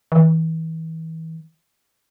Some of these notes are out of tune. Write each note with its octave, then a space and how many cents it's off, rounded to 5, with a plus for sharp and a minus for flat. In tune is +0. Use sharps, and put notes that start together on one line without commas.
E3 -35